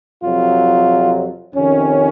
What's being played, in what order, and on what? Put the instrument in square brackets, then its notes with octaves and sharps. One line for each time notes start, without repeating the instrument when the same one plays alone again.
[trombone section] F2 C3 F#3 F4
F2 C3 D#3 C#4